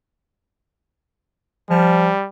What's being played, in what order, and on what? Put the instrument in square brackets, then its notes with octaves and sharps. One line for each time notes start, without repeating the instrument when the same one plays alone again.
[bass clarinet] F3 [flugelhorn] G3